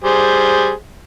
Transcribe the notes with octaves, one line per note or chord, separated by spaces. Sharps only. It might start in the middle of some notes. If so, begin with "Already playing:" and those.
G3 G#4 C5